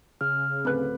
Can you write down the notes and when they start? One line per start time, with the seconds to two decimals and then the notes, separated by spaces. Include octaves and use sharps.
0.21 C#3 F6
0.65 D1 C4 B4 F#6